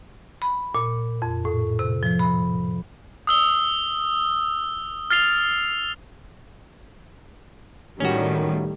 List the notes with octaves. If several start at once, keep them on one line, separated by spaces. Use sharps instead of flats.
B5
A#2
F2
A2
C3
F3
B5
D#6 E6 G7
F6 A6 C7 F7
A2 D#3 G3 C#4 F#4